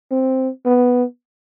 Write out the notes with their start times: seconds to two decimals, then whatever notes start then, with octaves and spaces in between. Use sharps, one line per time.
0.11 C4
0.66 B3